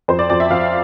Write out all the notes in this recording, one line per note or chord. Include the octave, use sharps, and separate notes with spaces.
F2 C5
D5
F2 D5
E5
F2 F5